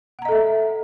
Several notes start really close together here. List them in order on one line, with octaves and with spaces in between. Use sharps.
F#5 A#5 D#5 A4 E5